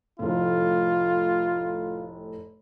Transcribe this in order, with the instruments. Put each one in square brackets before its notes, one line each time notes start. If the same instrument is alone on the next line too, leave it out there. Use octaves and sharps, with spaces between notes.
[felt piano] F1 A2 [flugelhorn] F4